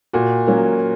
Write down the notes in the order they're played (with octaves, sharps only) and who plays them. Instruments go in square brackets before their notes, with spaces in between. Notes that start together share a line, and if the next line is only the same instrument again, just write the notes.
[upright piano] A#2 F#4
F#3 A#3 C#4